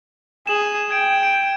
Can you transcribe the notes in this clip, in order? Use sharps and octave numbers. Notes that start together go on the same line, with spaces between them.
G#4 E7 F#7
G5 G#6 D7
D7